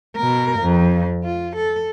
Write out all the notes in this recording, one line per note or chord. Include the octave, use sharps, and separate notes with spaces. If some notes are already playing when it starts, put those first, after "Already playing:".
B2 A#4
F2
F4
A4